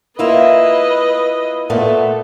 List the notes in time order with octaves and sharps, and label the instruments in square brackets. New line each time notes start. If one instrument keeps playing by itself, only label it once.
[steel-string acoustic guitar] A#3 E4 F4 [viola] B4 D#5
[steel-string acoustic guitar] A#2 A3 B3 [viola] A4